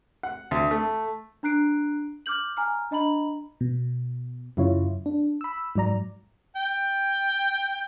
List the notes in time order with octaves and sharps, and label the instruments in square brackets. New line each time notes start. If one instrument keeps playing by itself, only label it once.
[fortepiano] F#5
D2
A3
[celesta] D4 A#5 F#6 C7 D7
D6 F6 G6 F#7
G#5 A#5 F6
D4 D#5 A#5 B5 F#7
[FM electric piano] B2
F#2 C#3 E4 F4 C#5
D4
B5 E6
G#2 F#3 D5 A#5
[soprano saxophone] G5